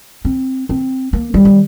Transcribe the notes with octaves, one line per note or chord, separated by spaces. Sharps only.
C4
C4
A#3
G3
D#3